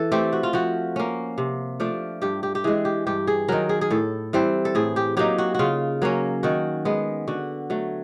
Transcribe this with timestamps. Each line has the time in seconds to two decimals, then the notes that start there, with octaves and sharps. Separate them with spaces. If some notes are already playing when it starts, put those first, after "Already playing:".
Already playing: E3 A4
0.12 A3 C4 G4
0.33 F#4
0.43 F4
0.53 F3 F#4
0.96 A#3 C#4
1.38 C3
1.80 F3 A3 D4
2.22 G2 G4
2.43 G4
2.55 G4
2.64 E3 G#3 G#4
2.85 G4
3.07 G2 G4
3.27 G#4
3.48 D#3 F#3 A#4
3.69 G#4
3.81 G#4
3.90 A2 A4
4.33 E3 G3 C4
4.65 A4
4.75 A2 G#4
4.96 G4
5.17 F#3 A#3 D#4 G4
5.38 F#4
5.55 C#3 F4 F#4
6.02 F#3 A#3 C#4
6.43 D#3 F#4
6.85 G#3 B3
7.27 D3 F#4
7.70 F#3 A3